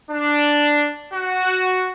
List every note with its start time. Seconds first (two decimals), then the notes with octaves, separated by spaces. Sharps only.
0.10 D4
1.13 F#4